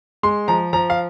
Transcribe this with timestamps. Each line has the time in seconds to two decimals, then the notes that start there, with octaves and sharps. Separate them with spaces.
0.23 G#3 C6
0.48 F3 A#5
0.73 F3 A#5
0.90 F5